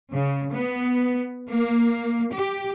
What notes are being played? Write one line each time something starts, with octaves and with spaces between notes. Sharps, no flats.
C#3
B3
A#3
G4